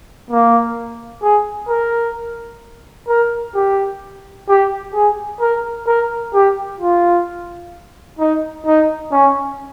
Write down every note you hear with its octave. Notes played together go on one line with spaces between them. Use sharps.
A#3
G#4
A#4
A#4
G4
G4
G#4
A#4
A#4
G4
F4
D#4
D#4
C#4